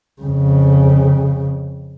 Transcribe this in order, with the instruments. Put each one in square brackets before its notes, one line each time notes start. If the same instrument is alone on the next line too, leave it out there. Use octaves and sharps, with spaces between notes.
[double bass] F2 C#3